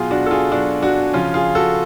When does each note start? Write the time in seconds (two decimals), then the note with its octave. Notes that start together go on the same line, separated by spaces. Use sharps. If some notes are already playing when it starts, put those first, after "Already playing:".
Already playing: B2 F#3 F4 G#4
0.11 D4 F#4
0.26 A4
0.31 F4 G#4
0.51 B2 F#3 D4 F#4
0.82 D4 F#4
1.13 C#3 F3 C#4 F4
1.34 F4 G#4
1.55 F#4 A4